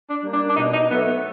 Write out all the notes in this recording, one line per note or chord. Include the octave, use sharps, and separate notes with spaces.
D4
G3 A#3
D4
D4
B2 D#4
D#4
F#3 A3 B3
B3